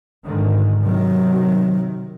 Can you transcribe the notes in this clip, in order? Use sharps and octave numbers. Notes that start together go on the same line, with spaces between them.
G#2 D3 D#3
C3 D#3 F#3